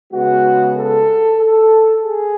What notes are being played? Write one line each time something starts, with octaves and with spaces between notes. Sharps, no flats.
C#3 G#3 B3 F#4
A4
A4
G#4